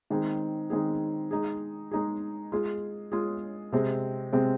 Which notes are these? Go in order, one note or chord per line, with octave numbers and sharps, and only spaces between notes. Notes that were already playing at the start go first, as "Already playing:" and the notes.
D#3 G#3 C4 G#4
D#3 G#3 C4 G#4
G#3 D#4 G#4
G#3 D#4 G#4
G#3 F4 G#4
G#3 F4 G#4
C3 G#3 C4
C3 G#3 C4